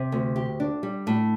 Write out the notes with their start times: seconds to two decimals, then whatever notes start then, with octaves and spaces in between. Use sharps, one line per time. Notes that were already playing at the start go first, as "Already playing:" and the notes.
Already playing: C3
0.12 D2
0.36 G4
0.60 D4
0.83 G3
1.07 A2